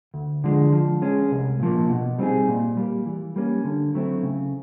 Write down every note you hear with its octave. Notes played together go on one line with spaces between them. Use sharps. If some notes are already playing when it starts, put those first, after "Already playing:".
D2
D3 F3 G#3
F3
G#3 C#4
C2
A#2 F3 A#3
B2
G3 C4 D#4 G#4
A#2
G3 A#3
E3
G3 A#3 C#4
D3
F#3 A3 C4 E4
C#3